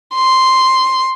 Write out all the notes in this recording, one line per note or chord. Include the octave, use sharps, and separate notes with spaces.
C6